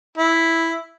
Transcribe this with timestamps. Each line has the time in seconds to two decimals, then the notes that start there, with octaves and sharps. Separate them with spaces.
0.17 E4